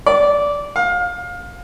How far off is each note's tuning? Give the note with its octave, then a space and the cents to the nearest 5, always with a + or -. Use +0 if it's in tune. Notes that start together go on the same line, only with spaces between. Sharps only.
D5 -15
F5 +25